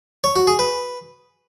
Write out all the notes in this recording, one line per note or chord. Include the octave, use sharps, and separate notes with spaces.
C#5
F#4
G#4
B4